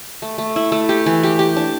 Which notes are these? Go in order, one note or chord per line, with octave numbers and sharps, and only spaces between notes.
A3
A3
E4
A3
G4
E3
G4
G4
D4